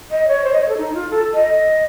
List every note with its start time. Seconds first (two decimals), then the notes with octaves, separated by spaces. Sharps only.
0.11 D#5
0.28 C#5
0.44 C5
0.53 D#5
0.61 C#5
0.69 A4
0.77 D#4
0.94 F4
1.11 A4
1.34 D#5